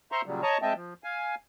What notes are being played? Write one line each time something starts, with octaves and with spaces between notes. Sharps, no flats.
C5 E5 A#5 C6 C#6
A#2 C#3 F#3 G3
C#5 D#5 A5 A#5 C#6
G#3 C4 D#5 E5 G5 A5
F3
F5 G#5